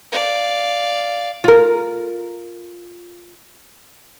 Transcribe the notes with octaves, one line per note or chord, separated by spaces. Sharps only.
D5 F5
F4 A#4